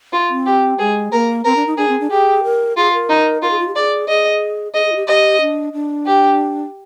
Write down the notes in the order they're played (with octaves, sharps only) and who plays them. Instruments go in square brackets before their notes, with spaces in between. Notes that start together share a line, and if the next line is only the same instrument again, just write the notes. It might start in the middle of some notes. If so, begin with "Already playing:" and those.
[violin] F4
[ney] C4
[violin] G4
[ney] G#3 [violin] G#4
[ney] A#3 [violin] A#4
[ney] C4 [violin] A#4
[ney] D4
D#4
[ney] D4 [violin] G#4
[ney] C4
D4
[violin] G4 [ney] G#4
[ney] A#4
[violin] F4 [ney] G#4
[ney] A#4
[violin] D#4
[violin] F4 [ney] A#4
[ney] G#4
F4
G4
[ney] G#4 [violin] D5
[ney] G#4 [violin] D#5
[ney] G#4 [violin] D#5
[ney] G#4
F4
G4
[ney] G4 [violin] D#5
[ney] D4
D4
[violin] G4